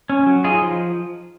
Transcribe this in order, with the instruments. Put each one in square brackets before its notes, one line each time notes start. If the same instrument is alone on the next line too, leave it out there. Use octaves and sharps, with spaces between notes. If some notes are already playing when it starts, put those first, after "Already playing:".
[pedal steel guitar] C#4
F#3
D#4 F4 G#4
F3